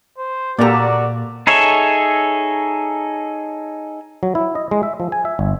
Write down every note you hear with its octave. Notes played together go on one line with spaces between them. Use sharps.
C5
A#2 A#3 F#4 G4 A4 D5 A#5
D#4 G#4 A4 C#5 E5
F#3
E4
D#5
G#3
E5
F3
G#5
E5
G1